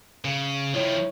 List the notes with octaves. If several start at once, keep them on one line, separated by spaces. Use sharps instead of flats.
C#3
D#3 F3 E4 C#5